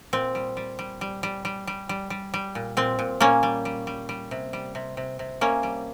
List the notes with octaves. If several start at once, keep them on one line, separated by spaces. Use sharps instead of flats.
A#2 C4
G3
G3
G3
G3
G3
G3
G3
G3
G3
G3
A#2
A#2 C4
A#2
A#2 A#3 C#4
G3
G3
G3
G3
C3
G3
C3
C3
C3
C3 A#3 C#4
G3